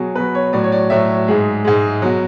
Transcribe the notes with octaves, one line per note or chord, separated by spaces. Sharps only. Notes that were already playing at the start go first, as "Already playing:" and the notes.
Already playing: B2 F#3 G#4
B2 F#3 B4
C#5
A2 F#3 D5
C#5
D5
A2 F#3 E5
G#2 G#3
G#2 G#3
B2 F#3